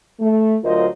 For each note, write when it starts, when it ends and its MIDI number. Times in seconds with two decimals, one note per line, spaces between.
0.20 0.55 57
0.64 0.86 38
0.64 0.86 54
0.64 0.86 65
0.64 0.86 70
0.64 0.86 72
0.64 0.86 75